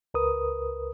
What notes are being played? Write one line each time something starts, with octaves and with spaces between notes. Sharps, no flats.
C#2 A#4 B4 D#6